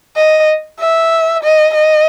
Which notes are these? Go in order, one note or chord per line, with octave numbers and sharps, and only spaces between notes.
D#5
E5
D#5
D#5